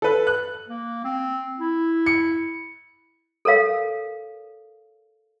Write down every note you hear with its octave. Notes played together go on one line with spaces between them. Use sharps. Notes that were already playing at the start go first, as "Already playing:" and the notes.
A4 B4
F#6
A#3
C4
E4
C#7
A4 A#4 C#5 F5